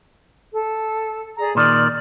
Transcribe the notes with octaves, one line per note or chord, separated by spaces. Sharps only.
A4
G#4 D5 A#5
A#2 D#3 D5